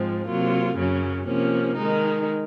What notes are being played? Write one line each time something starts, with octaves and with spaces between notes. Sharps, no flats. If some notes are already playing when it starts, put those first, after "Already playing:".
Already playing: G#2 F3 G#3 C4
C3 F#3 A#3 F4
F#2 C#3 F#3 C#4
C3 F3 A#3 C#4
D#3 G#3 D#4